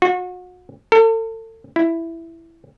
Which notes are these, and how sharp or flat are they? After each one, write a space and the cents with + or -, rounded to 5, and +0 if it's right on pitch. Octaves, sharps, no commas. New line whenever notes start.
F#4 -35
A4 +40
E4 +5